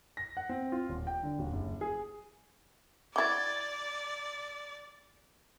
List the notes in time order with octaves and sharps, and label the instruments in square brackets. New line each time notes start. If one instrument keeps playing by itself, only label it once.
[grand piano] A#6
F#5
C4
F4
D#1
G5
D3
D#1
F#1
G#4
[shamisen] E4 F#4 [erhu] D5 [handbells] D6 G#6 A6